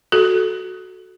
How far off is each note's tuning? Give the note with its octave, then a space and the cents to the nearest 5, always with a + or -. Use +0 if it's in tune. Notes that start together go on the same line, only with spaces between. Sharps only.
F#4 +0 A4 -15